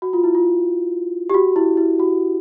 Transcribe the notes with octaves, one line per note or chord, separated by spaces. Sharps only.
F#4
F4
E4
F4
G4
F#4
E4
E4
F#4